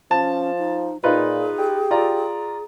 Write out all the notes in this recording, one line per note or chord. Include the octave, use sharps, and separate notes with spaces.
F3 C#4 A5
D#4
A#2 D#4 F4 G#4 B4
G4
F4 D5 A#5